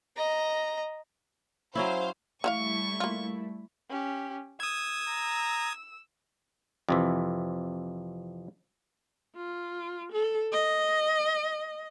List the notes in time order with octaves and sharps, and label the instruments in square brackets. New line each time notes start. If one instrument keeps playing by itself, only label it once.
[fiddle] D#5 A#5
[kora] F#3 C#4 E4 [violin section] C5 F5
[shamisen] E3 F4 F5 [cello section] G3 A3 E4 [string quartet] C#6
[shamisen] A#3 F4
[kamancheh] C#4 G4
[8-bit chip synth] D#6 G#6 [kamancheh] E6
[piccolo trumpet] A#5
[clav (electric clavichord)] F2 C3 E3
[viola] F4
A4
D#5